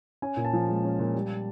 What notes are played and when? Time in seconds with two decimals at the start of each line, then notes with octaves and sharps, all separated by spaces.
0.22 C#4 G#5
0.37 A#2
0.45 A5
0.53 F3
0.68 G#3
0.84 C#4
0.99 A#2
1.14 G3